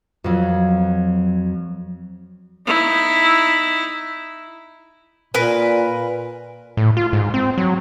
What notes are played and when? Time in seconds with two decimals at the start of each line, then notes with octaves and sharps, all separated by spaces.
0.24 F2 F#3
2.67 D#4 E4
5.34 A#2 A#4 B4 G#5
6.77 A2
6.97 F4
7.13 G#2
7.34 C4
7.58 F#3